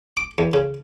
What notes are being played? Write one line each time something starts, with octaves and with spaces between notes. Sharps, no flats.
D6
E2
C#3